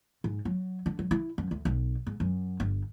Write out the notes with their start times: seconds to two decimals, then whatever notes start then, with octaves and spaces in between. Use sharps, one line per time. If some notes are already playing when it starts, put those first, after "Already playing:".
0.24 G#2
0.45 F#3
0.86 D3
0.99 F#3
1.11 E4
1.38 F#2
1.51 D2
1.65 B1
2.07 G#2
2.20 F#2
2.60 G1